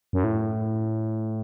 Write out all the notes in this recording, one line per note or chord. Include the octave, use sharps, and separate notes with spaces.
F#2
A2